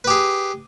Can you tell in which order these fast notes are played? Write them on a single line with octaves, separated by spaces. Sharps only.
B4 G4 G#4